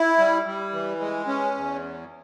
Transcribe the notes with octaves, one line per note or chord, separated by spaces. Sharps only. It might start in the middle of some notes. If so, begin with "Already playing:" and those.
Already playing: E4
G3
G3
E3
G#3
C#4
E2